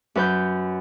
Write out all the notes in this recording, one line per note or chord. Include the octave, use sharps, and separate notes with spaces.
F#2 B4 G6